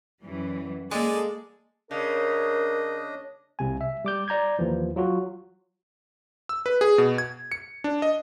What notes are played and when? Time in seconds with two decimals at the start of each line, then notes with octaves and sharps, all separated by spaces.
0.23 F#2 E3 G3
0.91 G#3 A#3 G#4 A4 D5
1.91 C#3 D4 A#4 D#5
3.59 C2 C3 G#5
3.81 E5
4.05 G3 D6 G6
4.28 D5 A#5 G6 G#6
4.59 D#2 E3 F3
4.96 F#3 F4 F#4
6.49 E6
6.66 B4
6.81 G#4
6.98 B2
7.18 G#6
7.52 C#7
7.84 D4
8.02 D#5